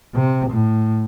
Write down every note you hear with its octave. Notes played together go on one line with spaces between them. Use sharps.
C3
A2